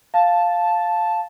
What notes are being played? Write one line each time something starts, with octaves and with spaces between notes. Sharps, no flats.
F5 A5